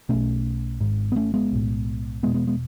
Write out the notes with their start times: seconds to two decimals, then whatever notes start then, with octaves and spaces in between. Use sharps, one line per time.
0.09 B1 B2 A3 C#4
0.81 G#1 G#2
1.12 B3
1.16 A3 C#4
1.34 G#3 B3
1.51 B1 A2
2.23 E1 E2 B2 G#3 B3
2.34 G#3 B3
2.47 G#3 B3